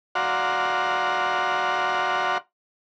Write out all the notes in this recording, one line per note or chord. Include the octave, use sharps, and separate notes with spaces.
F#4 D5 F5 F#5 A#5 C6